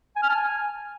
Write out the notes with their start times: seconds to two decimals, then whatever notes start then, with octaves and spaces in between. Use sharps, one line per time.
0.16 G#5
0.23 F6
0.29 A5
0.36 G#5